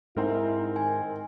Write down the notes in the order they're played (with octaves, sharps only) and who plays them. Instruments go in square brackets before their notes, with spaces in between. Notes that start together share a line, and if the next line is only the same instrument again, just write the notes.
[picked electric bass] G#2 [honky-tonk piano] C4 D#4 A#4 [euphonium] E4
[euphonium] D#3 [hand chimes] G#5